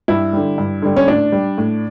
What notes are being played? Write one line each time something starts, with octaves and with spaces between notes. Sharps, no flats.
G2 E4
D3 G3
G2
D3 G3
C#4
A2 D4
G3
A2